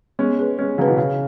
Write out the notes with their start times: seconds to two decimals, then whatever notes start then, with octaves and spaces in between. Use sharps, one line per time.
0.19 G#3 B3 C#4
0.39 G#4 B4
0.58 G#3 B3 C#4
0.78 C#3 F#3 G#4 B4
0.87 B2 E3
0.97 C#3 C#4